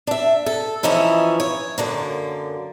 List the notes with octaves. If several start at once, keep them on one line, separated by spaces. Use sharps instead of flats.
D4 E5
A4
E3 F3 C#4 D#4 E4
C#5
F#2 D3 A#3